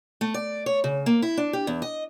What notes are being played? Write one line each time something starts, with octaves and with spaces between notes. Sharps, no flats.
A3
D5
C#5
C#3
A#3
E4
D4
G4
E2
D#5